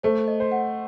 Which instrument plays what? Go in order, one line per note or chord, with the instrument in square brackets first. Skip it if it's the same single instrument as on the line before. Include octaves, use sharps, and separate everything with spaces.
[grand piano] A3 [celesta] C5
[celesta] D#5
[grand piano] C5
[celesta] F#5